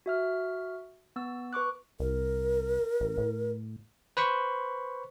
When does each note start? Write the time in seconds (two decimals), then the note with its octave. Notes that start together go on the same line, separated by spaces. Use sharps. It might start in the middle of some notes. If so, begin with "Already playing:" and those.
0.06 F#4 E5 F6
1.16 B3 E6
1.53 B4 C#6 D6 F#6
2.00 C2 A#4
3.00 A1
3.18 A2
4.17 B4 C5 B5 C#6